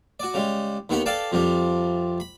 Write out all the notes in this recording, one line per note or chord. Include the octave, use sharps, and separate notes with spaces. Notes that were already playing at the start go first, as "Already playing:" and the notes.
F#4 D5
C#3 G3 G#3
D#2 D#3 B3 F#5 G5 B5
A4 B4 D5 F5 G5 A5
F2 C3 F3 G3
B5